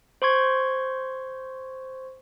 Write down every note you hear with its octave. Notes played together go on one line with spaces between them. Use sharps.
C5 C6 C#6 G#6